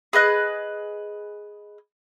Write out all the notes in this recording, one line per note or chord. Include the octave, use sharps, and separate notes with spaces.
G#4 B4 D#5 F#6